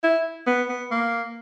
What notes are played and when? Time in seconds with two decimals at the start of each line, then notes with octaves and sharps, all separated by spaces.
0.03 E4
0.47 B3
0.69 B3
0.91 A#3